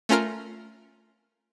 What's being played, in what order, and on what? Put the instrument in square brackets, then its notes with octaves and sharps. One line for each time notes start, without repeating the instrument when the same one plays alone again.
[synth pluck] A3 C#4 F4 A#4 F6